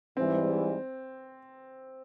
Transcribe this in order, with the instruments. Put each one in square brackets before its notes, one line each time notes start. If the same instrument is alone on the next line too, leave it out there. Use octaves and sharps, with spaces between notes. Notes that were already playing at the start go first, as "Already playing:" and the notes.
[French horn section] G#2 E3 G3 [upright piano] C4